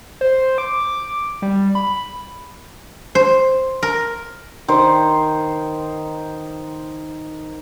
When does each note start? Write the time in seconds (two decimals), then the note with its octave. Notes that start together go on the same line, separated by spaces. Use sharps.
0.21 C5
0.58 D6
1.42 G3
1.75 B5
3.15 C5
3.83 A#4
4.68 D#3 C5